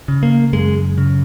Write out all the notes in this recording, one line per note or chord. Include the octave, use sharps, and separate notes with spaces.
C#3
A#3
F#2 G#3
C#3